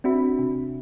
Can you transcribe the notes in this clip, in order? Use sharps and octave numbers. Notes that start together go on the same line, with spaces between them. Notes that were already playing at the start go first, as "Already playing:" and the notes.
C4 D4 F#4 E5 B5
C3